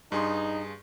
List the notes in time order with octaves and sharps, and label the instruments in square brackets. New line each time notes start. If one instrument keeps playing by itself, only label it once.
[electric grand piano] G2 G#4 C6 [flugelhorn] D#4